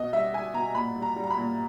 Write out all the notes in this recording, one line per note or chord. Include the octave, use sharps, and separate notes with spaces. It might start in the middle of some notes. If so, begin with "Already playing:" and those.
Already playing: B2 D#5
G3 E5
G3 G#5
B2 A#5
A#2 B5
G3
A#5
G3
A#5
B5
A#2